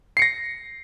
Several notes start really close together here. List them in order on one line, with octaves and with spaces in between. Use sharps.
C7 C#7 A#6